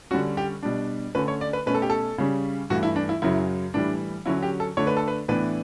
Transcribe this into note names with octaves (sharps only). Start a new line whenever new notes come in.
D3 G3 C#4 F#4
G4
B2 G3 D4
D3 A3 C#4 B4
C#5
D5
B4
B2 A3 C#4 B4
A4
G4
A4
C#3 G3 C#4
G2 E3 A3 F#4
E4
D4
E4
F#2 C#3 F#3 E4
A2 E3 G3 D4
D3 F#3 C#4 E4
G4
A4
D3 A3 D4 C#5
B4
A4
B4
A2 E3 B3 D4 B4